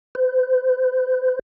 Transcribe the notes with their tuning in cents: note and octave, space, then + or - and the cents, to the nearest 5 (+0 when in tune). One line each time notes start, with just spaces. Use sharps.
C5 -40